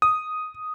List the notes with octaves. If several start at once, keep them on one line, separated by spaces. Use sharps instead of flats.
D#6